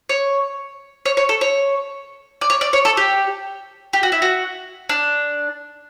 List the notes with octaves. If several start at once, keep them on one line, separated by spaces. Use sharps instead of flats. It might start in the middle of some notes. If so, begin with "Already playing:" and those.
C#5
C#5
C#5
A4
C#5
D5
C#5
D5
C#5
A4
G4
G4
F#4
E4
F#4
D4